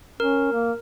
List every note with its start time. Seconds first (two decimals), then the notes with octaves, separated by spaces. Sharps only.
0.20 C#4 A#4
0.53 A#3